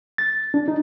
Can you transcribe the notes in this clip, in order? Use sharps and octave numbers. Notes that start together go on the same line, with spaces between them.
A6
D4
D#4